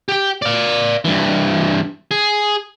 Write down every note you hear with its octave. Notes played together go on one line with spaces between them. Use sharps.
G4 G5
D5 F5
G2 E3
G#4